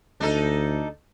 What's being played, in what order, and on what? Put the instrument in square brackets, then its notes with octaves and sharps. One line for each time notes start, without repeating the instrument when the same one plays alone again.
[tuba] D2 [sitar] D4 D#4 A4